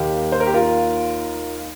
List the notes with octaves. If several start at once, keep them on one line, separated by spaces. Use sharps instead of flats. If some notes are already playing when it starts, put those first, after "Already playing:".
Already playing: D#2 D#3 A#3 D#4 G4
C5
A#4
G4
F4 A#4